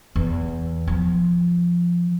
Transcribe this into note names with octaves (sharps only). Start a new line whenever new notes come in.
E2
F3